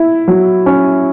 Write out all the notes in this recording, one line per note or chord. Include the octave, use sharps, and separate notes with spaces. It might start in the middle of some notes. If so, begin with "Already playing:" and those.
Already playing: E4
F#3
C#4